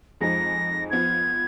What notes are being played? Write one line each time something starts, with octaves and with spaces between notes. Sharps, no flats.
F2 F3 G#3 D#4 A#6
F3 B3 F4 G#6